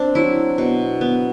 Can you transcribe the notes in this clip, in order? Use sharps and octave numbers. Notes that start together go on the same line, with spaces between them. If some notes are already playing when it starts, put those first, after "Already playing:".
Already playing: C4 D4
F#3 E4
B2
B3